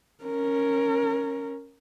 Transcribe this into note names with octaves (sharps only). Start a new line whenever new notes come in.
C#4 A#4